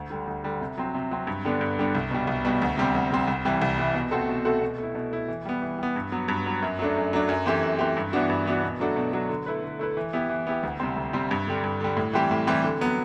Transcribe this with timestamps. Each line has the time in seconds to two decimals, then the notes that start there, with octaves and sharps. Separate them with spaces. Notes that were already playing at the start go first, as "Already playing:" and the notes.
Already playing: D2
0.10 D3 G3
0.27 D2
0.44 D3 G3
0.61 C3
0.78 F#3 C4
0.94 C3
1.11 F#3 C4
1.27 G2
1.45 D3 G3 B3 D4
1.61 G2
1.78 D3 G3 B3 D4
1.95 C2
2.11 B2 G3
2.27 C2
2.45 B2 G3
2.62 D2
2.77 C3 G3 C4
2.95 D2
3.12 C3 G3 C4
3.27 C2
3.45 C3 E3 G3
3.62 C2
3.78 C3 E3 G3
3.94 B2
4.11 A3 C4 F#4 A4
4.29 B2
4.45 A3 C4 F#4 A4
4.62 B2
4.78 A3 E4
4.95 B2
5.11 A3 E4
5.28 E3
5.45 G3 B3
5.62 E3
5.79 G3 B3
5.96 G2
6.12 F#3 B3
6.28 G2
6.46 F#3 B3
6.62 F#2
6.79 F#3 A3 D4
6.96 F#2
7.13 F#3 A3 D4
7.29 F#2
7.46 E3 A3 C4 G4
7.63 F#2
7.79 E3 A3 C4 G4
7.97 G2
8.13 E3 B3 D4 F#4
8.29 G2
8.46 E3 B3 D4 F#4
8.63 B2
8.80 F#3 A3 D4 F#4
8.96 B2
9.12 F#3 A3 D4 F#4
9.29 D3
9.46 A3 E4 B4
9.63 D3
9.79 A3 E4 B4
9.97 E3
10.13 B3 E4 G4
10.29 E3
10.47 B3 E4 G4
10.63 D2
10.80 C3 G3 C4
10.97 D2
11.13 C3 G3 C4
11.31 G2
11.48 D3 G3
11.64 G2
11.80 D3 G3
11.97 A2
12.13 E3 G3 C4 G4
12.31 A2
12.47 E3 G3 C4 G4
12.64 D3
12.81 F#3 B3